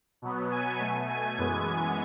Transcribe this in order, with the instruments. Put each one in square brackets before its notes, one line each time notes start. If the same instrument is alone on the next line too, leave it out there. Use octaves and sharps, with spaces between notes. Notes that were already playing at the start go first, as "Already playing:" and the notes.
[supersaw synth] B2 F#3 B3
G#5
B2 A3
G#5
F#2 E3 G#3 B3 G#5